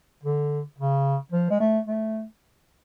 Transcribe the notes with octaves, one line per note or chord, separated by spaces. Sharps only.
D3
C#3
F3
G#3
A3
A3